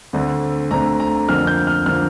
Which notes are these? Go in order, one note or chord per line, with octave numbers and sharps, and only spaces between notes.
D2 D3 A3 C4
D2 D3 A3 C4 A#5
A#5
F2 D3 F3 A#3 F6
G6
F6
D3 F3 A#3 F6